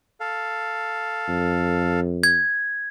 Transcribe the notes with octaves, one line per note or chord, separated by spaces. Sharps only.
A4 F5
F2
G#6